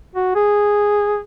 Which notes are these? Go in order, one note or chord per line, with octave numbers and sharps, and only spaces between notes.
F#4
G#4